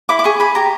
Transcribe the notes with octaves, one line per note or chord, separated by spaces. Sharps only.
E4 D6
D6
G#4 C#6
G#4 B5
G4 A#5